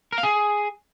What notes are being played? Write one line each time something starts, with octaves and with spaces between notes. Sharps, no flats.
A#4
F5
G#4